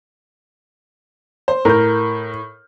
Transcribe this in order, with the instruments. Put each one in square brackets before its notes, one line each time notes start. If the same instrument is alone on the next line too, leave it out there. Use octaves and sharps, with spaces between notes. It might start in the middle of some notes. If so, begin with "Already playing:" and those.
[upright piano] C5
[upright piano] A2 G6 [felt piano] A#4